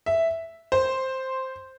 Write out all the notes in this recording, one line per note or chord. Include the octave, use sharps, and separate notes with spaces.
E5
C5